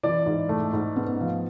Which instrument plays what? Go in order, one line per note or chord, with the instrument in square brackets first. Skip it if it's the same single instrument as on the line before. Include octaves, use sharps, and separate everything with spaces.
[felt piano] E3 [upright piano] D5
[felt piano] G#2
A3
G#2
B3
F3